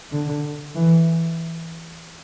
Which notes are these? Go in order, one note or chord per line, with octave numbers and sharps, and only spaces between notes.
D3
E3